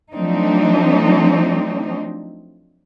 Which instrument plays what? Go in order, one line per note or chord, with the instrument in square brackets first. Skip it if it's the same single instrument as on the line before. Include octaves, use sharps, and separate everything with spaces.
[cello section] F3 F#3 A3 C4 D4 D#4